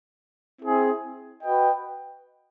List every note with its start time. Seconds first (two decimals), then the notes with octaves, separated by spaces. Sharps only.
0.62 C4 E4 G#4
1.43 F#4 B4 D#5 G5